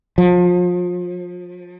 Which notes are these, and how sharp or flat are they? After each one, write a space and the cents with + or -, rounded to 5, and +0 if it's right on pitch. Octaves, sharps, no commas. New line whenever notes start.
F3 +30